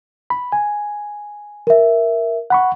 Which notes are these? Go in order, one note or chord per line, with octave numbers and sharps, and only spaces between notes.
B5
G#5
A#4 E5
F#5 B5 C#6